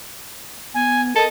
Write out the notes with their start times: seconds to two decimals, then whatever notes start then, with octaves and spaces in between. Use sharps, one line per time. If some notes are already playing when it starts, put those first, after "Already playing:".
0.74 B3 G#5
1.16 A4 A#4 D#5